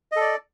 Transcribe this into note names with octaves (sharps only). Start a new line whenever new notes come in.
A4 D5 D#5